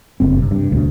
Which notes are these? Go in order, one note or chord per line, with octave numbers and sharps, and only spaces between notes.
F#1 G2 C4
C3
G2
D2 B2